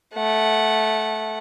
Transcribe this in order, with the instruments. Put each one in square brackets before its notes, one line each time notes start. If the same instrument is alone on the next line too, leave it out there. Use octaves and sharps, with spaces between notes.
[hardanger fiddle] A3 F#5